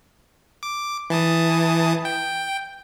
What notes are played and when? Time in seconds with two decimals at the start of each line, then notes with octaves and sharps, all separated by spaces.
0.63 D6
1.10 E3 A5 D#6
2.05 G5